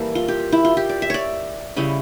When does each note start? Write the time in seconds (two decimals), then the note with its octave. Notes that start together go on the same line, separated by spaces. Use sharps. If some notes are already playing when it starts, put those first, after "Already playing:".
Already playing: E3 G3 A#3 A4
0.15 F4
0.28 G4
0.52 E4
0.65 F4
0.77 G4
0.89 D5
1.02 E5
1.10 C#5 D5
1.76 C#3 G3 C#4 E4